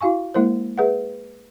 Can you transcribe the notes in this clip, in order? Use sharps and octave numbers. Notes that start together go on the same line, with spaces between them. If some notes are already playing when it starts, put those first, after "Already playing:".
E4 F#4 F5 G#5 C#6
G#3 A#3 E4 A#4 C5
G#4 B4 E5 F#5